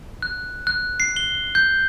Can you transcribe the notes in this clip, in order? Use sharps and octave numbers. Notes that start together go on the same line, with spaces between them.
F#6
F#6
C7
G7
G6